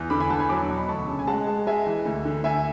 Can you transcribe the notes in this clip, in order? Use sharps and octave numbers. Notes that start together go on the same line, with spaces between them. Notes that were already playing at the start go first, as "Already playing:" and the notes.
Already playing: E2
D3 B5 D6
G#5 B5
E2 F#5 A5
G#5 B5
F#3 B5 D6
B2
B5
D2 A5 C#6
C#3
G#5
G#3 F#5 A5
G#3
G#3 E5 G#5
E3
D2
D3
D2 E5 G#5